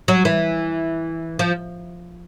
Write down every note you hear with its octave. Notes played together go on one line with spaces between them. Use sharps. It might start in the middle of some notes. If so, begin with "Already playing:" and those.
F#3
E3
F3